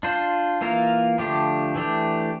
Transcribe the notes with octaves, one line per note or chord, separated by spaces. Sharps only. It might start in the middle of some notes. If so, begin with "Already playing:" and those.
D4 F4 C5
E3 A#3 F4 A#4
D3 F3 A3 D4 G4
E3 A3 D4 G4